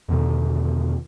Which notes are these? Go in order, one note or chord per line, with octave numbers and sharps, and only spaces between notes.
E2 B2 D3 D#3